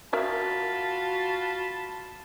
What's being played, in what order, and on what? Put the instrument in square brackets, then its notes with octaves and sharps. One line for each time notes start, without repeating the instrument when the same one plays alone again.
[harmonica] F4 A5 B5 [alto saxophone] F#4 [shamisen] A#4 E5 F5